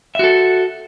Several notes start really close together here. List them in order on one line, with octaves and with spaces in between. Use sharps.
E5 F#4 A4